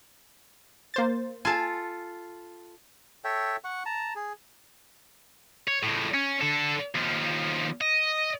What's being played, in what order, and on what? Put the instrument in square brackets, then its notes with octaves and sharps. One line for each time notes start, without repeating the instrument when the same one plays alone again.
[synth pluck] A#3 C5 A6
[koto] F4 A4 [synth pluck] G#5 A5
[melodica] A4 C#5 E5 G5
F#5 C#6
A5 A#5
G#4
[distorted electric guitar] C#5
C#2 A2
C#4
D3 A4
D#2 F3
D#5